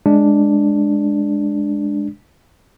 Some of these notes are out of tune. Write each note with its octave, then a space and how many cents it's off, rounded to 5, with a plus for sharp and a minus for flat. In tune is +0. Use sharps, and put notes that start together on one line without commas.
G#3 +0 D4 +0